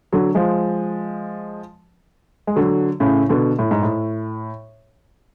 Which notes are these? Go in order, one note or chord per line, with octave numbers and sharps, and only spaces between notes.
D3 F#3
F3 G#3
G#3
D3 F#3
A2 C#3
B2 D3
A2
G#2
A2